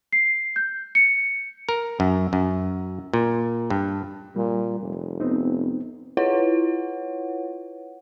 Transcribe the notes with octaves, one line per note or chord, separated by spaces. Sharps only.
C7
G6
C#7
A#4
F#2
F#2
A#2
G2
A#2 G3
F1
B3 C4 D#4
E4 F4 B4 C#5 F#5